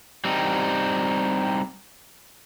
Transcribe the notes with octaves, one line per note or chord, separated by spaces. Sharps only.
G3 C4 D#4